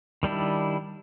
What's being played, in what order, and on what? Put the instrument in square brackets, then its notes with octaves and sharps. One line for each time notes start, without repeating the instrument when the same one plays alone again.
[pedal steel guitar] D#3 G3 D4 E4